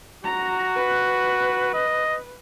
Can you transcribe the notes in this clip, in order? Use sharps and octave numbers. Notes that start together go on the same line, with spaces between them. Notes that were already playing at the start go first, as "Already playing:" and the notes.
F#4 A#5
B4
D#5